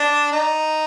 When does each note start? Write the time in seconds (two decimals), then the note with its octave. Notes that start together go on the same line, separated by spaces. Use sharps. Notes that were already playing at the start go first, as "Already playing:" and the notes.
Already playing: D4
0.32 D#4